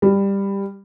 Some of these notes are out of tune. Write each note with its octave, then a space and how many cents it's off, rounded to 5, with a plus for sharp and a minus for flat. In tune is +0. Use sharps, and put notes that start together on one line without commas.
G3 +15